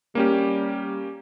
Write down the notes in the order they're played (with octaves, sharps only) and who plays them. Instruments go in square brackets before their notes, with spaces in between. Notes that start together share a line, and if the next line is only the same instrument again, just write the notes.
[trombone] G3 [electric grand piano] A#3 C#4 G4